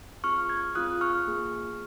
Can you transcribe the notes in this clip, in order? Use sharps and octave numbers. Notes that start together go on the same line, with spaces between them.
C4 F4 G#4 C#6 F6
F6 G#6
C4 F4 G#4 D#6 F#6
C#6 F6
A#3 F4 G#4